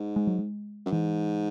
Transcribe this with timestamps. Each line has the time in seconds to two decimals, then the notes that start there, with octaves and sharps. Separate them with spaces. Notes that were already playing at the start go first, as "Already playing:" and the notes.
Already playing: G#2
0.16 G#3
0.27 F#3
0.38 G#3
0.86 F#2
0.92 G#2 E3